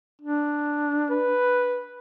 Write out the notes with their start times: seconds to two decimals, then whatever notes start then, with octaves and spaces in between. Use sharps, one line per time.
0.22 D4
1.11 B4